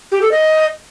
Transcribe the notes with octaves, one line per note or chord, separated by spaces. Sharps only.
G4
A4
D#5